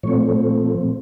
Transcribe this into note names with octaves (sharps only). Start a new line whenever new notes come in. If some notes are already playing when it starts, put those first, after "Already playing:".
A#2 F3 A3 C4 C#5